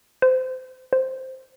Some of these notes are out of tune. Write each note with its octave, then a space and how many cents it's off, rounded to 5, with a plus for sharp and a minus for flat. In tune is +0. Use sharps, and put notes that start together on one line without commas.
C5 -25
C5 +0